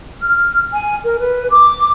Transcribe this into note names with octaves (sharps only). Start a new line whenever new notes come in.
F6
G#5
A#4
B4
D6